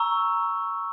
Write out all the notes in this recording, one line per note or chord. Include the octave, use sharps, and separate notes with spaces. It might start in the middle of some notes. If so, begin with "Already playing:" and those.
Already playing: A#5 C#6 E6